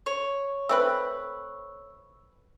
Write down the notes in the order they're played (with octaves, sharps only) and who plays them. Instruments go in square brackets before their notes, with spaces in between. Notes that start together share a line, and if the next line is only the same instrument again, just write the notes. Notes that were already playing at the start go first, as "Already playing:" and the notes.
[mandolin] C#5
[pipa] A3 C4 B4 [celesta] E6